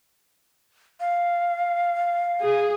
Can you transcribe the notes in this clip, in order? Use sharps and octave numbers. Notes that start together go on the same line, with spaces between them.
F5
G#4